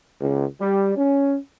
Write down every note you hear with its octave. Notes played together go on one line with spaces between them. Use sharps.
C#2
G3
C#4